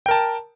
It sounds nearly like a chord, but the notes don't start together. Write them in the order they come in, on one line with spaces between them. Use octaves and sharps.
G5 A#4 A5